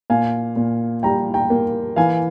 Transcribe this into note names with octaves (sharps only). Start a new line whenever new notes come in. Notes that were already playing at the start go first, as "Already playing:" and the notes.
A#2 F5 G#5
A#2
G3 G5 A#5
G5 A#5
A#3
E3 F5 G#5